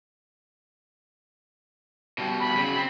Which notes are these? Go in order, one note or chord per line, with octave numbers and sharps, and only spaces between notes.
B2 G3
B5
C#3 F#3
C4